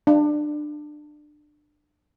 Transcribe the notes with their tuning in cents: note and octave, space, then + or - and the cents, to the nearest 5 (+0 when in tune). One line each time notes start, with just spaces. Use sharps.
D4 +25